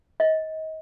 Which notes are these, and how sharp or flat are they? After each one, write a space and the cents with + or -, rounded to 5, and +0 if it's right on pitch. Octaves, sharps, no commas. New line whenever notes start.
D#5 +30